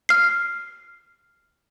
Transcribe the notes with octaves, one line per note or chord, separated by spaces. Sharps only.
F6 C7